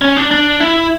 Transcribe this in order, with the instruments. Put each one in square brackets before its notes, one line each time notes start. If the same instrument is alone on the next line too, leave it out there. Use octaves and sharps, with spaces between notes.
[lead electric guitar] C#4
D4
D4
E4